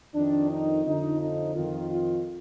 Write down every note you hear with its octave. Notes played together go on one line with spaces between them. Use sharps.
F2 D#3 D4
D#4
F2 D3 F3 D#4
D#4
F2 D#3 F4
F4